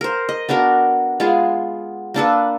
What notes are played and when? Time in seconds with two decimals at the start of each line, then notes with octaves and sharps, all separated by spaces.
0.01 A#4 C5
0.29 D#5
0.49 B3 D4 F#4 A#4
1.20 G#3 B3 F4 G#4
2.14 A#3 D4 A4 B4